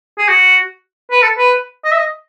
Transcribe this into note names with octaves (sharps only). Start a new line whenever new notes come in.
G#4
F#4
B4
A4
B4
D#5
E5
D#5